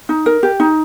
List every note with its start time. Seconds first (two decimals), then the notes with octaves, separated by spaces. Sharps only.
0.09 D#4
0.26 A#4
0.43 G4
0.60 D#4